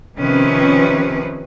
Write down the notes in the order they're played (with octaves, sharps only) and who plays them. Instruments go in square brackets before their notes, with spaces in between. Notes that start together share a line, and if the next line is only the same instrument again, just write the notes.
[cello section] C3 D#3 F3 C4 C#4 B4